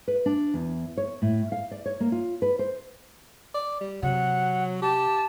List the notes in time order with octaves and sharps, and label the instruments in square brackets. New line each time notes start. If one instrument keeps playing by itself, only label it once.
[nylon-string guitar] B4
D4
E2
C#5
A2
F5
D5
C#5
A#3
F4
B4
C5
[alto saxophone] D5
G3
[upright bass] C3 [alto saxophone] F#3 [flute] F#5
[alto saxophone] G4 [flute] A5